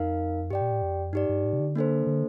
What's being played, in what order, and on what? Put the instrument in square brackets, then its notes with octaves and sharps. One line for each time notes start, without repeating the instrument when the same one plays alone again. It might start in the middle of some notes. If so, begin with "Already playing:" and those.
Already playing: [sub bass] F2 [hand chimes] D#4 A#4 F5
[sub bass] G2 [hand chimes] G4 D5 G5
[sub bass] A#2
A2
F2
[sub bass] G2 [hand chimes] D#4 G4 D5
[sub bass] G2
A2
C3
D3
[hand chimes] A#3 D4 A4 C5
[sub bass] D3